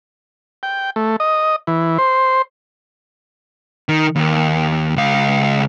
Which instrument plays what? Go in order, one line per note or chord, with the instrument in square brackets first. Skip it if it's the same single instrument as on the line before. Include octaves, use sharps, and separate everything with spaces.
[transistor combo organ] G5
A3
D#5
E3
C5
[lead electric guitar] D#3
D#2
C#2 F5